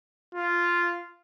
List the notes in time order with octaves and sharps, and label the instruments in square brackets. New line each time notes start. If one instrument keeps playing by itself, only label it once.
[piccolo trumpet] F4